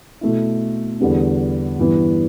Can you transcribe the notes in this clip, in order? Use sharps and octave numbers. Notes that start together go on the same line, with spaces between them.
B2 A3 E4
E2 D3 G3 B3 D4
G2 E3 B3